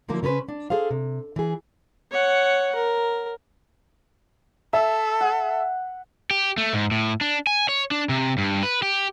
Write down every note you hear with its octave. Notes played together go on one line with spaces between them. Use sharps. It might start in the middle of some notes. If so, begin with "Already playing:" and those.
D3 F3 F#3 A#3 E4
C#3 C#4 A4 B4 C5
D4
G#4 A4 C5 F5
C3
E3 G#4
C#5 F#5
A#4
A4 E5
F#5
G4
A3
G#2
A2
D4
G#5
C#5
D4
C3
G2
B4
G4